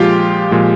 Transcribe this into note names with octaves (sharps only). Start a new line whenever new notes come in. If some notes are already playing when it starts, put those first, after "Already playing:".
Already playing: A#2 F3 G#3 F4 G4
A#2 F3 G#3